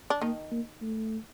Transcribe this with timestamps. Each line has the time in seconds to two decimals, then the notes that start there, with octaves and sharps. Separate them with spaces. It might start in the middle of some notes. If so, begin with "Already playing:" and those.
0.10 D4
0.22 D#3 A#3 D#4
0.51 A#3
0.82 A3